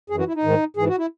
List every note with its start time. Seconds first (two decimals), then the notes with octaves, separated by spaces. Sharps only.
0.10 F#2 G#4
0.14 E3 F#4
0.27 E4
0.35 D#4
0.43 G#2 D#3
0.77 G#2 E3 G#4
0.88 F#4
0.98 E4